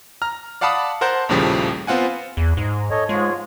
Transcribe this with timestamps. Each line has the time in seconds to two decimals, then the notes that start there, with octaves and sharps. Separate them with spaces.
0.22 A#5 F6
0.61 D5 F5 F#5 A5 B5 D#6
1.01 A#4 C5 F#5 A5 G6
1.29 A#1 D#2 A2 C#3 F3 G3
1.87 B3 C4 F4 F#5 G#5
2.37 E2
2.57 G#2
2.91 A4 C#5 D#5
3.09 G#2 G#3 F4 C#5